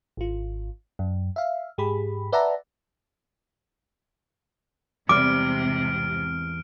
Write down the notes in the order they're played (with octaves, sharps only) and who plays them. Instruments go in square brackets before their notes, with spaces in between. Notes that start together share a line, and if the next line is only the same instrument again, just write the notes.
[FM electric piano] G#1 F4
F#2
E5 F5
G#2 G4 G#4 B5
B4 D5 E5 F#5 A5 A#5
[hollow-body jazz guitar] E2 G3 [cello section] G#2 C3 [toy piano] D6 [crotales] F6 D7